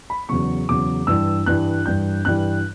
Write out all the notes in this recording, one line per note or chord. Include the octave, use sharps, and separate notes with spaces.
B5
E2 C#3 F#3 C#6
E2 C#3 F#3 D6
G2 E3 G3 E6
G2 E3 G3 F#6
G2 E3 G3 G6
G2 E3 G3 F#6